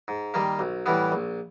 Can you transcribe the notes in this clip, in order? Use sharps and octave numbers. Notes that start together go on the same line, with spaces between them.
G#2
D#3 G3 A#3
B1
A2 E3 G3 B3
A#1